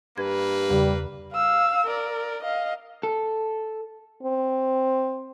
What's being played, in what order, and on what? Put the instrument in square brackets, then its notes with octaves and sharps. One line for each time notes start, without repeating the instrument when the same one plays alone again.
[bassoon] G2 [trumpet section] A#3 B4 [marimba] G#6
[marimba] E2 C#3 [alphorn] G3
[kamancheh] F5 E6
A#4 D5
D#5 F5
[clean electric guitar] A4
[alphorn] C4